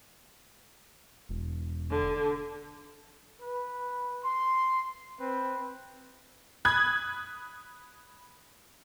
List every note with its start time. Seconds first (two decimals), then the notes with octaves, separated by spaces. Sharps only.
1.29 E1
1.90 D3
3.40 B4
4.25 C6
5.19 C4 B4
6.65 B5 D#6 F#6 G#6